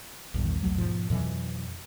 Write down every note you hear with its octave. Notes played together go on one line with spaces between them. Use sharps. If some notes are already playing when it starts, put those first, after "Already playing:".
A#1 E2 G2 D#3
B1 E2 F#3 A3
G#2 B2 F3
F2 B2 E3 F#3